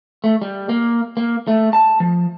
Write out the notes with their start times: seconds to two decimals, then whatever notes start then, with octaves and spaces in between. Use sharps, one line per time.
0.24 A3
0.42 G3
0.69 A#3
1.17 A#3
1.47 A3
1.73 A5
2.00 F3